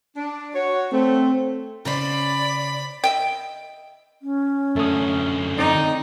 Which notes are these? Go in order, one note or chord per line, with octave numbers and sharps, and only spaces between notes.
D4
F#4 C#5
A3 C4
C#3 C#4 C5 D5 B5
D#5 E5 G5
C#4
F#2 D3 A3 D#6
C4 D#4 D5